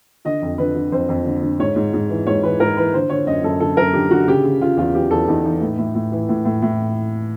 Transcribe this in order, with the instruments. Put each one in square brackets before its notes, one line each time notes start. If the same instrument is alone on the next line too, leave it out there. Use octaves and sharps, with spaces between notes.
[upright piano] D3 D#5
F2
D3 B4
D3
F2 C5
F2
D3
D3
G#2 C#5
G#2
G#2
E3
G#2 C#5
E3 B4
G#2 A#4
E3 B4
D3 C5
D3 C#5
F#2 D#5
F#2 A4
D3 A4
F#2 A#4
D3 G4
D3 F#4
C#3 G4
C#3
C#3 F4
E2 F4
E3 G4
E2 A4
E2 D#4
E3 D#4
A2
A2
A2
E3
A2
A2
A2